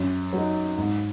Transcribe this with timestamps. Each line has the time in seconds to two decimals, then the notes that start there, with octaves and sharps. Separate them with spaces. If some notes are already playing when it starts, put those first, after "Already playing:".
Already playing: F#2
0.33 F#3 D#4
0.77 G#2